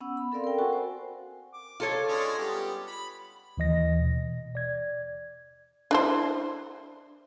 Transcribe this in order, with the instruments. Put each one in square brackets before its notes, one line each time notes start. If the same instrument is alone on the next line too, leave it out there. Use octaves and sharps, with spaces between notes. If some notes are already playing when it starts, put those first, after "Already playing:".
[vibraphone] B3 C#4 F#5 E6
B5
C4 A4 A#4 D5 F5 C6
A#4 G5
F#4 F#5 G#5 C#6
C5
[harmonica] D6
[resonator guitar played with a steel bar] F4 A4 C#5
[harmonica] G#3 C#4 D4
G3 B3 G4
B5
[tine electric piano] D#2 E3 D#5 A#6
B2
D5 G#6
[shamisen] D4 E4 C5